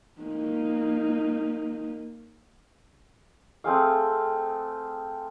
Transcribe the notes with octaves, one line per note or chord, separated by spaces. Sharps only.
A#3 D#4
A3 C4 G#4 F5